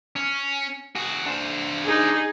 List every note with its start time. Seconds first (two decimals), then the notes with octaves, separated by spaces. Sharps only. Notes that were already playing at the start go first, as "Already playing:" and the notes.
0.16 C#4
0.95 F#4 G#4
1.26 D4 C5
1.84 D#4 G#4